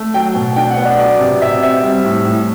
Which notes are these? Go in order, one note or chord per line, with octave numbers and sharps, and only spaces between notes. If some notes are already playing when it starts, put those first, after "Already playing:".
Already playing: A3
F#3 G5
B2
D4 G5
F#5
B3
D5
F#3 D5
C3
C3 E5
C4 E5
G3
A2
A2